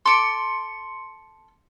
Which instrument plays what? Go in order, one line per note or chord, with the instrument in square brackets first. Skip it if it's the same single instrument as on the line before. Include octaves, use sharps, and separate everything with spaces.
[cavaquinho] A4 D6 [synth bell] C6 C#7